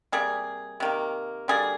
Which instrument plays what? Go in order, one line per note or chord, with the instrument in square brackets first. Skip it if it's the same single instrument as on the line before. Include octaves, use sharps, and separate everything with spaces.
[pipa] C3 G3 A#3 G#4
C3 D#3 A#3
D3 G3 A#3 G#4